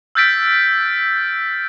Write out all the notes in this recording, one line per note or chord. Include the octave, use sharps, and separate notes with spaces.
E6 F6 G6 A6 B6 D7